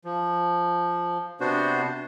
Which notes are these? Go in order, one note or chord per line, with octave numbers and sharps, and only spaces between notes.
F3
C3 B3 D4 F#4 C5